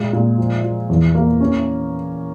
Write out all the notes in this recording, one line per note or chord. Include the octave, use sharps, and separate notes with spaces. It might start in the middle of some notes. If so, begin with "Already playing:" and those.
Already playing: A#2 G#3
A#2
F3
F3
E2
A#3
C#4